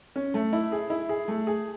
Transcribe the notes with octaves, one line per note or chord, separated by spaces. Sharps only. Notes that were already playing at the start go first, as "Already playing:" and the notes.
C#4
A3
E4
G#4
E4
G#4
A3
G#4